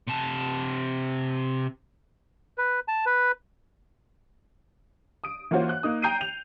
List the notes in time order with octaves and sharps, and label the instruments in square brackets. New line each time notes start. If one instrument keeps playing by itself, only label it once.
[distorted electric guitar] C3 A5
[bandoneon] B4
A5
B4
[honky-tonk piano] D#6 D7
E3 A#3 C#4 F4 F#4 C5
F#6
A#3 D#4 D#6
G5 A#5 G6 C7 D7 D#7
F7